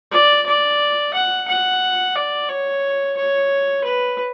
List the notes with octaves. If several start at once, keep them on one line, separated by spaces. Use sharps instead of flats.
D5
D5
F#5
F#5
D5
C#5
C#5
B4